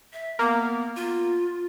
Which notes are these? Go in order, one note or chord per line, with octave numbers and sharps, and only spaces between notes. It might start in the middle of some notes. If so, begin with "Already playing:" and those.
E5
A#3 B3
F4